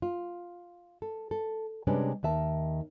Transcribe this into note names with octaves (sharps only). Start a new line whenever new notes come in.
F4
A4
A4
C3 G3 G#3 C#4 D4 B4
D#2 D#3 E5 A5